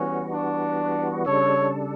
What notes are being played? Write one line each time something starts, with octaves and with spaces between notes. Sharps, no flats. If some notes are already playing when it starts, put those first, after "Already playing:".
Already playing: E3 G3 B3 C#4 F#4
D4
C#3 G3 D4 A4 C#5